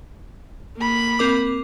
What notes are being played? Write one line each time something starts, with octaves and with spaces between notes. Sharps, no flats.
A#3 B5
C4 A#4 D6